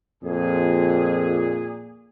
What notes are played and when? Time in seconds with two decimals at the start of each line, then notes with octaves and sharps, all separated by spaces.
0.23 F2 A#2 G#4